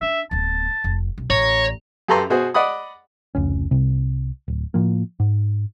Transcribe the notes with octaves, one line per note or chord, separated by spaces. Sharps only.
D4 E5
D1 B3 A5
F1
B1
A1 C#5 A#5
F#2 G4 A4 B4 A#5 C6
B2 F#4 G#4 C5
D5 D#5 F#5 B5 D#6
F1 C#2 C#4
C2 C3
D1
A2 F3 A#3
G#2